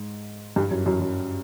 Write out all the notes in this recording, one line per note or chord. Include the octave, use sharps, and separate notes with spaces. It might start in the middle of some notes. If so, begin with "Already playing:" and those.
Already playing: G#2
G2
F#2
F#2
F#2